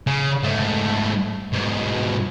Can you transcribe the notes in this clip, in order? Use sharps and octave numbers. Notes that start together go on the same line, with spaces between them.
C#3
G#2 A3
G#2 B2